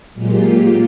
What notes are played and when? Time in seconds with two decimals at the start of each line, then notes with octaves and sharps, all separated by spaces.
0.13 A#2 F#3 G#3 A#3 F4 G4